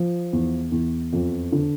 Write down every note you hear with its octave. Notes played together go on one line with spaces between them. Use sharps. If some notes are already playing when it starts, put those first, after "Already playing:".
Already playing: F3
E2
E2
F2
D3